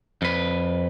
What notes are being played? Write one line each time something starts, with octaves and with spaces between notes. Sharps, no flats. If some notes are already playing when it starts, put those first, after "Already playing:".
F2 B4